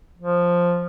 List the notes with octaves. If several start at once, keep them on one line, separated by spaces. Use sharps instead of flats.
F3